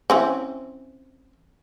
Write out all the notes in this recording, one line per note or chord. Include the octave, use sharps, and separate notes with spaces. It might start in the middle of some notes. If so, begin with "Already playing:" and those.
E3 C4 C#4